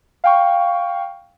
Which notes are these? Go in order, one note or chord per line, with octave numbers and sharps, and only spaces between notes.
F5 G5 C#6